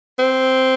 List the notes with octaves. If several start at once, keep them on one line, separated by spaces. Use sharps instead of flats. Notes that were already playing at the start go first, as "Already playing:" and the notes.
C4